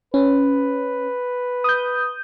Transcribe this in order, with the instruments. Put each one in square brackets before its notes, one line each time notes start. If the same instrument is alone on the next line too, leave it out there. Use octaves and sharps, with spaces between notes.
[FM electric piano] C#4 [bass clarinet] B4
[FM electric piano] D#6 G6